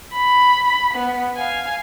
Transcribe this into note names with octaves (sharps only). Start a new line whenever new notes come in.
B5
B3
F5 G#5